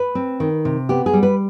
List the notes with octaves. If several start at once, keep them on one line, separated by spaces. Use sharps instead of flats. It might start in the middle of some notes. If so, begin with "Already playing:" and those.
Already playing: B4
C4
D#3
C3
B3 G4
G#4
G3
B4